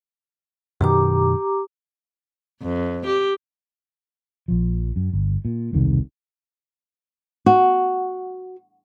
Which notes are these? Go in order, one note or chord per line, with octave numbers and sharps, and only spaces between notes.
F#2 B2 D#3 G4 A#5 D6
F2
G4
A#1 F3
F#2
G1
A#2
E1 C2 C3 D#3
F#4